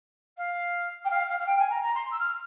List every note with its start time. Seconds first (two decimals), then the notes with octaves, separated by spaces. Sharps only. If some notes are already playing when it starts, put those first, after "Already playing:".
0.37 F5
1.05 G5
1.10 F5
1.29 F5
1.39 F5
1.46 G5
1.58 G#5
1.70 A#5
1.83 A#5
1.95 C6
2.11 E6
2.19 F6